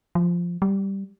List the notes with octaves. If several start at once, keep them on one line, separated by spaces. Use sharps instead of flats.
F3
G3